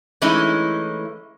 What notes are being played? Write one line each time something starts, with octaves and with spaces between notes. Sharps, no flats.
E3 G#3 A3 C#4 D#4 E4